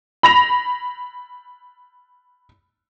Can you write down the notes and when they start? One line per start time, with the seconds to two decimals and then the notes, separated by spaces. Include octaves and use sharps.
0.23 B5 A#6 F7